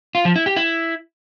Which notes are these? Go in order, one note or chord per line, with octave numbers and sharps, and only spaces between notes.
F4
F3
E4
G4
E4